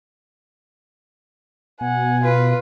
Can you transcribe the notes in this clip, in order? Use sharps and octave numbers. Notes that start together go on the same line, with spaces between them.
B2 F#5 G#5
F4 B4